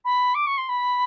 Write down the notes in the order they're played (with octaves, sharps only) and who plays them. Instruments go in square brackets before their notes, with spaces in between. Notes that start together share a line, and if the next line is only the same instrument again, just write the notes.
[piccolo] B5
D6
C#6
C6
B5